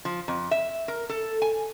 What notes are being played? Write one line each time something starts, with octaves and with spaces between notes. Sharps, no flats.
F3
F2
E5
A#4
A4
G#5